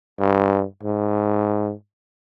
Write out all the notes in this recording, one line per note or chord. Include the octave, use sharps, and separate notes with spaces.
G2
G#2